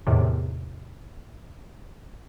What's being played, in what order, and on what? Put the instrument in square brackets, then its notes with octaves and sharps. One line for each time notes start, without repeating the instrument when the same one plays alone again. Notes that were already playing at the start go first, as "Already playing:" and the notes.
[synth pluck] E2 A2 C3 D#3